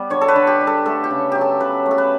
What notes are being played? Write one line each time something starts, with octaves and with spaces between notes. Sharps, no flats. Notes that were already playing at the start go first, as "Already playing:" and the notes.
Already playing: G3 B3
D3 C#5
A4
B4
D3
G4
G3
A4
A3 A4
G4
C#3
F#3 G4
A4
C#3 B4
A3
A4
B4